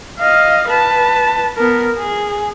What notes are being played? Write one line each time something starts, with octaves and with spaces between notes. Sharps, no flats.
D#5 F5
B4 A5
B3 A#4
G#4